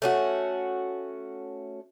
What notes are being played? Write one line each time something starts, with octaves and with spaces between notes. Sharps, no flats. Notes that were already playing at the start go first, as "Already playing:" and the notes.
A3 C#4 F#4